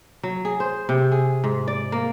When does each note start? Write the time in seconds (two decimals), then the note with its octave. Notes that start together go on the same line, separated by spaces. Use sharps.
0.23 F#3
0.45 G#4
0.60 C5
0.89 C3
1.12 G#4
1.44 G#2
1.68 D5
1.92 A#3